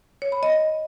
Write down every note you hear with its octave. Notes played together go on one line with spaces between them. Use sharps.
C#5
B5
D#5